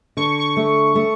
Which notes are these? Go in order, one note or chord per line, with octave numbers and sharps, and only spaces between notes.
D3 C#6
C#6
A3
A3